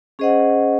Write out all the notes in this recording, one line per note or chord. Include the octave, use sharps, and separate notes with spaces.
C#4 G#4 C5 D#5 F#5